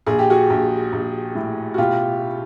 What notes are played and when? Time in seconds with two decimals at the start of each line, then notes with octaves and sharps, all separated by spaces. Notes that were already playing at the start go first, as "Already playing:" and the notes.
0.06 A#1 G#4
0.19 G4
0.30 F#4 G#4
0.50 A#1
0.92 A#1
1.35 A2
1.74 F#4
1.78 B2 F4 G4